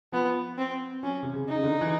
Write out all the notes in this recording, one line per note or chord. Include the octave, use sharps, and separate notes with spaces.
F3 B3
C4
F#3 C#4
C3
C#3
D#4
C#3
D3
E3